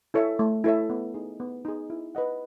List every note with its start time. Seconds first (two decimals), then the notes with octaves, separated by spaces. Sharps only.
0.14 E4 A4 C#5 E5
0.39 A3
0.64 E4 A4 C#5 E5
0.90 B3
1.14 D#4 G#4
1.40 B3
1.65 D#4 G#4
1.90 E4
2.15 B4 D#5 F#5